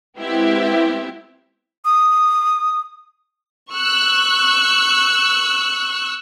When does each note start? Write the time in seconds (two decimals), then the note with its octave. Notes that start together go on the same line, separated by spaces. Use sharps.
0.18 G#3 B3 C4 E4 G4 E5
1.85 D#6
3.72 C#6 E6 F#6